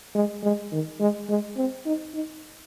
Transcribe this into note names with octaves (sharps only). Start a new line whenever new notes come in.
G#3
G#3
D#3
G#3
G#3
C4
D#4
D#4